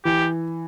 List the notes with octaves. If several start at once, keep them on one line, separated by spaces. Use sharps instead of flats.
E3 G4